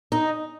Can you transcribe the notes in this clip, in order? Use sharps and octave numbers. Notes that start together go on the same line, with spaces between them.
D#4